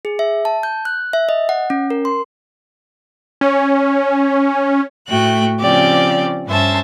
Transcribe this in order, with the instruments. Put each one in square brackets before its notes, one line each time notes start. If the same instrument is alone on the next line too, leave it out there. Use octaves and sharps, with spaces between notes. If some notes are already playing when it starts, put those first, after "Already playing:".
[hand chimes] G#4
E5
A5
G6
F#6
E5
D#5
F#5
C#4
A#4
C6
[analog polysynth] C#4
[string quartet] A2 A3 F#4 G5 F#6
C#3 F3 C4 G4 D5
G2 C#4 C5 E5 A5